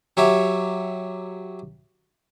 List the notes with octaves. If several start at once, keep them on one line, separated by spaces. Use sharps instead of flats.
F#3 G4 C#5 E5